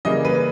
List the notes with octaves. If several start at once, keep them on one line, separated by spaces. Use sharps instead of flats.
C#3 E3 G3 A#3 D#5
B4